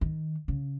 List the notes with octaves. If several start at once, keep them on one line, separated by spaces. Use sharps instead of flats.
D#3
C#3